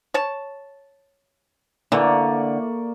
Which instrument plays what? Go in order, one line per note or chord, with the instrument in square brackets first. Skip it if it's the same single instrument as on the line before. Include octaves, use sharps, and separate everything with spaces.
[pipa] C#5 A5
[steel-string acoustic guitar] D3 [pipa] E3 [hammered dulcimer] A#3 D5 C#6